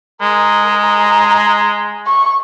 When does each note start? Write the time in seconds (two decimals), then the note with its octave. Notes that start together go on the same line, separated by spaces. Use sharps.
0.21 G#3 A#4
0.86 A#5
2.06 C#6